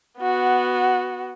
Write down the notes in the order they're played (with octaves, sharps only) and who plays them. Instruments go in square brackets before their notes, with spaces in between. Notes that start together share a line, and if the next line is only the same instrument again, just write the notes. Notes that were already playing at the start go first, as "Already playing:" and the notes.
[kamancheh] B3 F#4